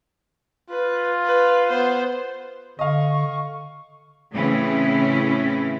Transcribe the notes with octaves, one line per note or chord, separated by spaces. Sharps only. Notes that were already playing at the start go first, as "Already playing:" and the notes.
F4 B4
B4
B3 C5
D3 D#5 F5 C#6
A2 C#3 E3 C4 C#4 E4